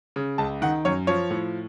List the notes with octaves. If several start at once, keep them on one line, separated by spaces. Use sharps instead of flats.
C#3
C#2 A5
D#3 F#5
F#2 C#5
F3 C#5
A2